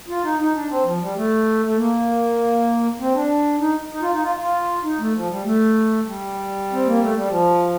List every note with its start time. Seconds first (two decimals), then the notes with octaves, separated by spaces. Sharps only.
0.08 F4
0.24 D#4
0.39 D#4
0.54 D4
0.69 C4
0.85 F3
1.00 G3
1.16 A3
1.65 A3
1.77 A#3
3.00 C4
3.15 D4
3.60 D#4
3.91 D#4
4.02 F4
4.12 D#4
4.22 F4
4.40 F4
4.84 D#4
4.99 A3
5.14 F3
5.29 G3
5.44 A3
6.06 G3
6.73 C4
6.86 A#3
7.00 A3
7.15 G3
7.28 F3